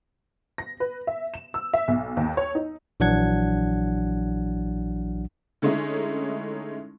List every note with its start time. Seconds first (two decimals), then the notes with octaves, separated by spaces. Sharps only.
0.58 A#6
0.80 B4
1.07 E5
1.34 E7
1.54 E6
1.74 E5
1.88 B1
2.17 D#2
2.37 C#5
2.55 D#4
3.00 A#1 E3 F#3 D4 F#5 G#6
5.62 D3 G#3 A3 C#4 D#4 E4